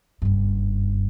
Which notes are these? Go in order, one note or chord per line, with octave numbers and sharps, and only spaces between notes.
F#1 G2